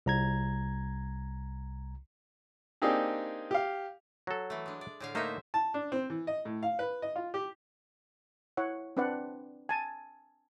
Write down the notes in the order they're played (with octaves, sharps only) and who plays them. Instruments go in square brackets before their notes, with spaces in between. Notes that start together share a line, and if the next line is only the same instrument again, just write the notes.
[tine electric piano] C2 A#5 G#6
[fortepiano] A#3 C4 D4 D#4 G4 G#4
G4 F5
[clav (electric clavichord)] F#3 A4
[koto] E3 A3
G#3 D4
D5
A2 D3 F5
[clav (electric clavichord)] A3 A#3 D#4 [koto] C5 E5
[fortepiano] A5
D4
C4
E3
D#5
A2
F5
B4
D#5
F4
G4
[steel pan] E4 C#5 F#5
C4 D4 B4 D5 F#5
G#5 A5